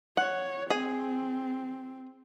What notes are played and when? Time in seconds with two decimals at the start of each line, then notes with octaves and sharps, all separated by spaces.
0.17 C#5 F#5
0.70 C4 G#4 G#5